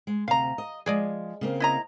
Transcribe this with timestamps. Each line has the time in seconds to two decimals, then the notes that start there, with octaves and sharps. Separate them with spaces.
0.07 G#3
0.28 D2 C3 F5 A#5
0.58 D#5
0.86 F3 G#3 G#4 D5 D#5
1.41 C#3 A#3 C4
1.60 E4 D#5 A#5